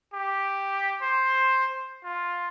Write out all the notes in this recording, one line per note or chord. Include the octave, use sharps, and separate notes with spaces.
G4
C5
F4